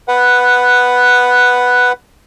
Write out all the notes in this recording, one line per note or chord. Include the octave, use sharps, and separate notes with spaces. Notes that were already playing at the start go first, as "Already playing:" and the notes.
B4 F#5